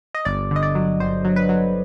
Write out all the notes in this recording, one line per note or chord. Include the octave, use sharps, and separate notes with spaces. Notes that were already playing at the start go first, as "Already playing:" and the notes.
D#5
G1 D5
D3 D#5
D5
F#3
G1 C5
F#3
B4
F#3